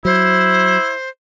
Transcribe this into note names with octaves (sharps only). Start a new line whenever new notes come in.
F#3 E4 C5